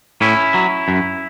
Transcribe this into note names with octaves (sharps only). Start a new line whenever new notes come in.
A2 C#4 E4
F#3
F#2